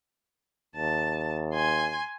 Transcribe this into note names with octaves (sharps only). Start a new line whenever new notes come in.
D#2 A5
G#5 C6